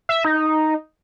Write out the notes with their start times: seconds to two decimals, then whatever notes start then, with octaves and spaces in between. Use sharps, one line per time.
0.09 E5
0.25 D#4